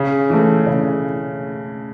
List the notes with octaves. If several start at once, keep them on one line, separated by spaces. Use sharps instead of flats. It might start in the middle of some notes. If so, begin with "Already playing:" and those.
Already playing: C#3
E3 A3
C#3